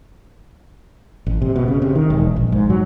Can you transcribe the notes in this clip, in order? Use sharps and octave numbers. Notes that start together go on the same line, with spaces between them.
A1
C3
B2
C#3
C3
D#3
E1
A#1
G#2
F#3